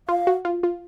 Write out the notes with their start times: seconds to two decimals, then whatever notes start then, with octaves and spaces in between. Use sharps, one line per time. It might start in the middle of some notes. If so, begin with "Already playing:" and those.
0.08 F4 F5
0.27 F#4
0.45 F4
0.63 F4